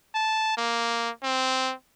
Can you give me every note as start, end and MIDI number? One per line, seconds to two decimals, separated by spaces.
0.15 0.53 81
0.57 1.10 58
1.23 1.73 60